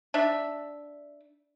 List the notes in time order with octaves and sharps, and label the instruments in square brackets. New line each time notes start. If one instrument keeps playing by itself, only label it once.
[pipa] D4 E5